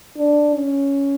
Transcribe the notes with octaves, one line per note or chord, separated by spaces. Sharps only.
D4
C#4